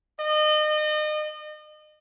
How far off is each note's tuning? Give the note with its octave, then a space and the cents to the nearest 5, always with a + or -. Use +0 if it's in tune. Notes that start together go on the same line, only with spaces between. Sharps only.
D#5 -35